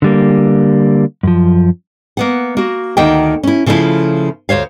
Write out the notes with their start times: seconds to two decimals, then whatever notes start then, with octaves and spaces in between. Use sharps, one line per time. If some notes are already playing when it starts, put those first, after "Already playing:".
0.02 D3 G3 A#3
1.23 F#2 F3
2.17 A#3 B3 F#5
2.57 A#3 F#4
2.97 D2 D#3 A#3 F#5 G5
3.43 C#4 E4
3.66 C#3 F3 A3 C#4 E4 F4
4.49 D2 C5 C#5 F5